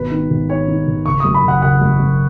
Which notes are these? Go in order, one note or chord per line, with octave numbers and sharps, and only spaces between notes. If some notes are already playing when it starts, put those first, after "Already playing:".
Already playing: G#1 B2 B4
D#3
G#1
D#3 C#5
D#3
G#1
F#1 C#6
F#2 D#6
B5
F#1 F#5
F#1 F#5
F#2
F#2